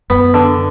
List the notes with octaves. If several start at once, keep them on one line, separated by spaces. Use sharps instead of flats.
F#2 B3
D3